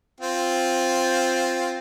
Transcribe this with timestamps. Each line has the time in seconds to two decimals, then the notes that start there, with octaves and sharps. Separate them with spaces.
0.21 C4 F4